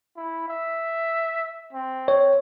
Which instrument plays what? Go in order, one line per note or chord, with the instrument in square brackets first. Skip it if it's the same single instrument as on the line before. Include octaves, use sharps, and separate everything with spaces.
[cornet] E4
E5
C4
[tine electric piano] C#5